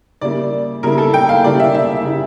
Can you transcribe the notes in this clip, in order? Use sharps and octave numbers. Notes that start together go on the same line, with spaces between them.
C#3 G3 A#3 E4 D5
C#3 G3 A#3 E4 A#4
A4
G5
F5
C#3 G3 A#3 E4 D5
E5
E5
C#3 G3 A#3 E4